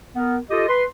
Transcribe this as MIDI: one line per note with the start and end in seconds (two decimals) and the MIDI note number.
0.15 0.37 59
0.15 0.37 70
0.50 0.67 65
0.50 0.67 67
0.50 0.67 69
0.50 0.67 75
0.68 0.84 71
0.68 0.84 84